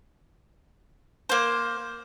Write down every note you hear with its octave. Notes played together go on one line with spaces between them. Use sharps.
A#3 C5